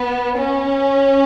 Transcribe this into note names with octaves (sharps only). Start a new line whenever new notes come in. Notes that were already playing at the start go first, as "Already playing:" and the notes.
Already playing: B3
C#4